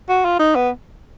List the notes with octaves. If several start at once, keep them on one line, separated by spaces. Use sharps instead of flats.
F#4
F4
D#4
B3